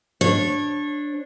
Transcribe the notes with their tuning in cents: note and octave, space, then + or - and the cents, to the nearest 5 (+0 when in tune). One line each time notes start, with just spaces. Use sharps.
D4 +0 C#5 -25